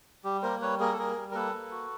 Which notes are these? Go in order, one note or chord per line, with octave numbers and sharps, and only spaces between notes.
G3 G4
A#3 A#4 C5
G3 B4 C#5
A#3 G#4 A#4
A4
G3 G#4 A#4
G3
A#4
A#3 A4 B4
A#3
F#4